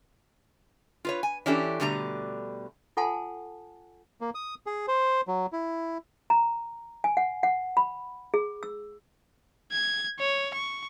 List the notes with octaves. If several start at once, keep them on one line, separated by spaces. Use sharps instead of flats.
F4 B4 C#5
G#5
E3 C#4 D4 E4 G4 A4
B2 D3 G3 A3 A#5
F4 A4 F#5 G#5 A5 C6
A#3
D#6
G#4
C5
F#3
E4
A#5
G#5
F#5
F#5
B5
G#4
E6
G#6
C#5
C#6